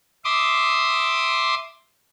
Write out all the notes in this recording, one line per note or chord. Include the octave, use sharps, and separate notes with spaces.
E5 C6 D6 D#6